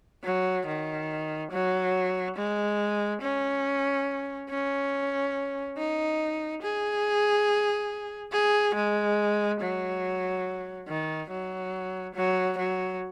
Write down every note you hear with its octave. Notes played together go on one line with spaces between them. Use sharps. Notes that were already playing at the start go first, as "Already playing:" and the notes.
F#3
D#3
F#3
G#3
C#4
C#4
D#4
G#4
G#4
G#3
F#3
D#3
F#3
F#3
F#3